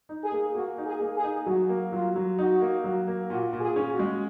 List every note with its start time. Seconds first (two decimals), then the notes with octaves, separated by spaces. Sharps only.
0.09 D#4
0.24 G#4
0.32 A#3
0.55 A#3 F#4
0.78 D#4
0.85 G#4
1.01 A#3
1.16 G#4
1.24 D#4
1.46 F#3 F#4
1.69 A#3
1.92 F#3 F4
2.16 F#3
2.39 D#4 F#4
2.62 A#3
2.84 F#3
3.07 A#3
3.30 A#2 F#4
3.53 A#2
3.61 G#4
3.76 C#4
3.91 F#4
3.99 G#3